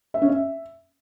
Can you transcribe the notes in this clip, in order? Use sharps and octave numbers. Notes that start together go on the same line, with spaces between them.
E5
C#4
E5